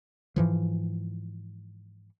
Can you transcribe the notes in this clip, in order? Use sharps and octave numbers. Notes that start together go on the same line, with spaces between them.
G#2 E3 F3